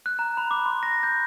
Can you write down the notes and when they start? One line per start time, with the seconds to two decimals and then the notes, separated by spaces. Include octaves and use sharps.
0.06 F#6
0.19 A#5
0.37 B5
0.51 D6
0.66 C6
0.83 A#6
1.03 G6